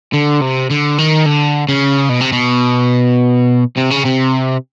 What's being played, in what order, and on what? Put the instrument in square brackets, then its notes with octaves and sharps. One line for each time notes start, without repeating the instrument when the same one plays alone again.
[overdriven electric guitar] D3
C3
D3
D#3
D3
C#3
B2
C3
B2
C3
C#3
C3